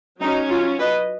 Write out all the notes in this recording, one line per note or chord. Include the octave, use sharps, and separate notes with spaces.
F#3 C#4 D#4
F4
B4 D#5